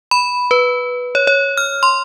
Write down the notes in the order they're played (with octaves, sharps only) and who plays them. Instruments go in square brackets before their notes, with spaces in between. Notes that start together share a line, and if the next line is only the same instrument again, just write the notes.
[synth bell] B5
B4
C#5
C#5
F6
C6